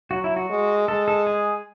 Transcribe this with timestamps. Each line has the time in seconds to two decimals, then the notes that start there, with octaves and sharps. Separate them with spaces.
0.11 F#3 F#4
0.24 E4
0.37 F#4
0.49 G#3
0.88 G#3 A4
1.08 A4
1.27 G#4